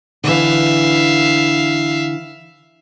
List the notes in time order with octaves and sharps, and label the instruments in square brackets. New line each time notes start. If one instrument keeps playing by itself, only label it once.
[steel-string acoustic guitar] D3 E3 [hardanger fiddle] E5 F5